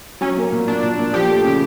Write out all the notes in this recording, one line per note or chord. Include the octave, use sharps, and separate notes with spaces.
F#3 C#4
A#3
A#2
A#2 D4
A#2
A#2
F3 G4
A3
C#3